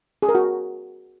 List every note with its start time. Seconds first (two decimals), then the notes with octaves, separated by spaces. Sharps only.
0.22 G#4
0.29 A#4
0.35 F#4